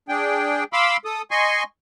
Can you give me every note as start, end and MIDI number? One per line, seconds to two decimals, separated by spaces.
0.09 0.64 62
0.09 0.64 68
0.09 0.64 79
0.73 0.97 77
0.73 0.97 83
0.73 0.97 84
0.73 0.97 86
0.73 0.97 88
1.05 1.22 69
1.05 1.22 87
1.31 1.63 75
1.31 1.63 80
1.31 1.63 84
1.31 1.63 85